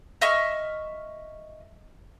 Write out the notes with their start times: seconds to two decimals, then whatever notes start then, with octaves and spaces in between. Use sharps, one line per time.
0.21 D#5 E5 C#6 F6